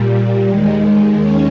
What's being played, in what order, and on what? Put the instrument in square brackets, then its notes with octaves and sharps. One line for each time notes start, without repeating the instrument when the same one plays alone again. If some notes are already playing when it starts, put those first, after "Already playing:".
Already playing: [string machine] A#2 G3
D#2 D#3 G#3
C#4